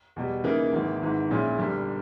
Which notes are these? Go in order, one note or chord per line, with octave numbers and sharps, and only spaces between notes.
E2 B2 G3
C#3 E3 A#3 D#4 A#4
G#1 G#2 E3 A#3
G#1 G#2 E3
A#1 A#2 G#3 C#4 E4
G1 G2 G3